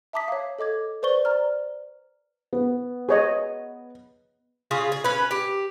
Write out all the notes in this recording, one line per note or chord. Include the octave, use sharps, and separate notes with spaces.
E5 A5 A#5 D6 D#6 B6
C#5 F5
A4 D#5 D6 G#6
B4 C5 D5 C#6 G7
D5 A#5 F6
B3
G#4 C#5 D#5
C#3 F4 G#4
G#4
C#4 B4
G4